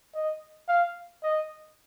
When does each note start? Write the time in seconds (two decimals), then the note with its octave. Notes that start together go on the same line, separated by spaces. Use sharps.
0.14 D#5
0.68 F5
1.23 D#5